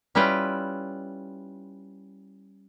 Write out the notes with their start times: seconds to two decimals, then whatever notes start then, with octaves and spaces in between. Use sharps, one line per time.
0.15 G3 C#4 E4 F4 B4 G5